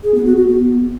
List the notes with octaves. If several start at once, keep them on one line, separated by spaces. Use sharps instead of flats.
G#4
B3
F#4
F#4
B3